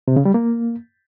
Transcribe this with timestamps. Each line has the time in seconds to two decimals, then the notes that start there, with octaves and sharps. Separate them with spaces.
0.08 C3
0.17 C#3
0.25 G3
0.34 A#3